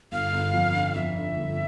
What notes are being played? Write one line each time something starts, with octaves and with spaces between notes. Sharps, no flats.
G1 F5
G1
F2
D3
F2 E5
D3
G1